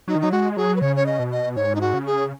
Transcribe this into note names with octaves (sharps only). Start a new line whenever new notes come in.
F#3 D#4
D#3
F#3 D#4
G#3 F#4
F#3 G#4
B4
C#3 C#5
C#5
D#5
B2
D#5
G#2 C#5
D#4
F#4
C#3
G#4